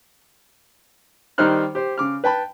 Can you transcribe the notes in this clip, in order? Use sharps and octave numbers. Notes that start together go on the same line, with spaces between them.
D#3 G3 D#4 C5 F6 F#6
G4 C5
C#3 D6 F6
B4 G5 A5 B5